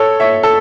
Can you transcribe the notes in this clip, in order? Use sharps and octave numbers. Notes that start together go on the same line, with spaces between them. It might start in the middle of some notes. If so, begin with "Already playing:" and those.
Already playing: A4 C#5
C#5 E5
A4